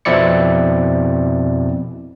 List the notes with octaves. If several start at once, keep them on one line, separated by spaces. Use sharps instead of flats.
F2 B2 C4 E4 D5 C#7